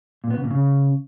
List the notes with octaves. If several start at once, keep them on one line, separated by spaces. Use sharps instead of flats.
A#2
B3
C#3
A#2
C#3